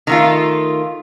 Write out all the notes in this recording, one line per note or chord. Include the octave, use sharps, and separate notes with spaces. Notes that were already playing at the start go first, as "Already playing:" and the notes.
D#3 A3 F4